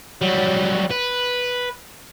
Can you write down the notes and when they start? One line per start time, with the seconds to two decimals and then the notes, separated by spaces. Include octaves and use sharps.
0.21 F#3 G3
0.91 B4